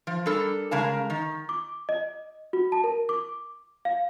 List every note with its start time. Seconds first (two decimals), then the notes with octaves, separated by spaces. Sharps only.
0.07 F3
0.26 G3 D4 A4 A#4
0.71 C#3 G#3 A#4 F5 A5
1.10 D#3
1.49 D6
1.89 D#5
2.53 F#4
2.72 A5
2.84 A#4
3.09 D6
3.85 F5